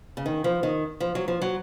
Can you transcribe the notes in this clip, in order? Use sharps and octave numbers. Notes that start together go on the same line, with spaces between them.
C#3
D#3
F3
D#3
F3
F#3
F3
F#3